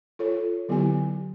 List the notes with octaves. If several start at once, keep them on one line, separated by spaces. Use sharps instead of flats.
F4 A4 C#5
D3 F#3 B3 E4 G4 G#5